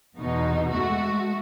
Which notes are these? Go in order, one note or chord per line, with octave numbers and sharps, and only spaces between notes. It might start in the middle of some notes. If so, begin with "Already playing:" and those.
E2 B2 D#4
G#3 A3 F#4